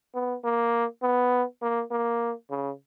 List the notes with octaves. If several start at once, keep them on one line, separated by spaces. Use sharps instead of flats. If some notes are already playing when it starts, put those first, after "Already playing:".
B3
A#3
B3
A#3
A#3
C#3